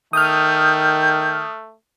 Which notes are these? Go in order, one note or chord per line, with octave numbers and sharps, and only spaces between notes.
D#3 A3 D#6 F6 G6